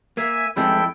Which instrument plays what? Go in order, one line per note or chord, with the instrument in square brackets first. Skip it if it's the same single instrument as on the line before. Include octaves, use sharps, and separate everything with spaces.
[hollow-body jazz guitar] A#3 [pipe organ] E5 G#5
[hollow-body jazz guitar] F2 C3 G#3 [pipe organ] E4 A4 G5